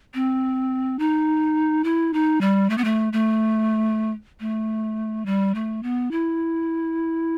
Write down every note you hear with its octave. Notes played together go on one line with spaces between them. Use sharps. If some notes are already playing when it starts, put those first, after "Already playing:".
C4
D#4
E4
D#4
G3
A3
B3
A3
A3
A3
G3
A3
B3
E4